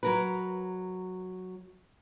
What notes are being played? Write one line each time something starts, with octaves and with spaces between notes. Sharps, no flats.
F#3 A#4 B4